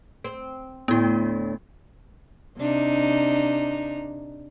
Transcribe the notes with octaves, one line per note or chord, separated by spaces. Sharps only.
C4
D2 A2 B3 E4
C3 D4 D#4